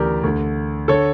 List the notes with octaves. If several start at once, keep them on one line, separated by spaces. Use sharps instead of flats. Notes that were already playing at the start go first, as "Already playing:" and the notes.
Already playing: D2 C#3 E3 G4 A#4 D5
D2 D3
D3 A4 C#5